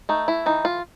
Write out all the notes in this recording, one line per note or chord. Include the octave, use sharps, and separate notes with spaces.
A3 D#4
E4
E3 D#4
F4